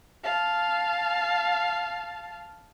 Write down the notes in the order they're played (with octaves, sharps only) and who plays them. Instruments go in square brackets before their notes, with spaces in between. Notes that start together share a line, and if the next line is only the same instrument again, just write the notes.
[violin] F5 A5